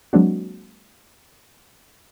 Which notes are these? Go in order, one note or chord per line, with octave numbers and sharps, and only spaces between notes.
F#3 G#3 A#3 C4 D4 F#4